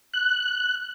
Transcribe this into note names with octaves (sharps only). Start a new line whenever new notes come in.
F#6